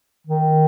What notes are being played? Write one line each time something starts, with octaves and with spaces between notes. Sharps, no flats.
D#3